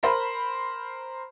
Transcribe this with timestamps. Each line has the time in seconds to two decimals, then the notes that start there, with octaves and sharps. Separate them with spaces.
0.03 A#4 C5 B5